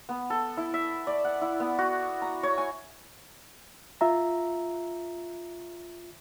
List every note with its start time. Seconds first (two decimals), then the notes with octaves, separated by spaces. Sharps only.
0.09 B3
0.30 A4
0.57 E4
0.74 E5
1.07 D5
1.25 F#5
1.41 E4
1.60 B3
1.78 F#4
2.22 A#5
2.43 C#5
2.58 G#5
4.01 F4 E5 A#5